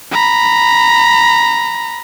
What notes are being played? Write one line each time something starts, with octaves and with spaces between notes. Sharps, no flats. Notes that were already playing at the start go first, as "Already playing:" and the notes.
A#5 B5